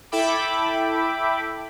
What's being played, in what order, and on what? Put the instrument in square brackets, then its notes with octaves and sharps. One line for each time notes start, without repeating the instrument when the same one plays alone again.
[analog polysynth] E4 A4 E5 G5 B5 D6